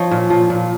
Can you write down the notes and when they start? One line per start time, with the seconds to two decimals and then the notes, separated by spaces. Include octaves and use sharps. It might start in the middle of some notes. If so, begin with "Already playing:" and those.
Already playing: F3 C#5 D#5
0.11 A#2
0.30 F3
0.50 A#2